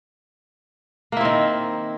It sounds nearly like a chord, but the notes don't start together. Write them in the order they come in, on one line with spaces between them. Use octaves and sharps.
A#3 E4 C4 D#3